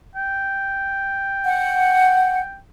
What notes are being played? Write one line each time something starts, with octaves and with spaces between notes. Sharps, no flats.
G5
F#5